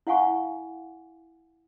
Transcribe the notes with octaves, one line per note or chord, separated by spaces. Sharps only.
E4 F5 F#5 G#5 C#6